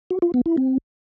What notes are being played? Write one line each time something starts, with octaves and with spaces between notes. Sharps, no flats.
F#4
F4
B3
E4
C4